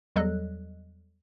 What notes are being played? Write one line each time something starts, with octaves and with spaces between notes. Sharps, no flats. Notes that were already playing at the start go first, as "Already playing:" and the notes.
E2 F#3 G3 A4 D#5 F#6